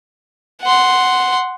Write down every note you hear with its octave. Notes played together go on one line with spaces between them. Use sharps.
F#5 C6